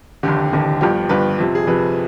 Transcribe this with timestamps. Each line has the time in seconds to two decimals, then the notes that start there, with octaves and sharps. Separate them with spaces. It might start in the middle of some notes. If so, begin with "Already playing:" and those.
0.23 F1 D#2 D3 G4
0.52 F1 D#2 D3
0.81 G1 G2 F3 G4
1.09 G1 G2 F3 B4
1.38 F2 C3 F3
1.55 G#4
1.67 F2 C3 F3 B4